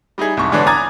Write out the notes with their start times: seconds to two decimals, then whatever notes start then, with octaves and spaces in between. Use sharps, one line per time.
0.18 G3 D#4 E4 G#4
0.37 C2 F2 G#2 C#6
0.52 D3 E3 G#3 B3 D4 C#5
0.67 G#5 A#5 D6 D#6 G#6 A6